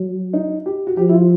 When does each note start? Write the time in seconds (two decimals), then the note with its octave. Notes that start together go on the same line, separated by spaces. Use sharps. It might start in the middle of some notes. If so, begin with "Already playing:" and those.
Already playing: F#3
0.33 D#4
0.66 G4
0.87 F#4
0.97 F3 G4
1.09 E4
1.13 F4